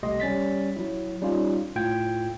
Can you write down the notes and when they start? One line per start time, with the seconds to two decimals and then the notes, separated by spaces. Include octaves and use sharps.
0.03 C2 A3 G4 D#5 C6 A#6
0.20 G3 C#4 A6 B6
0.76 F#3 E4
1.22 G3 C#4 D#4 F4
1.76 A2 F4 G5 G#6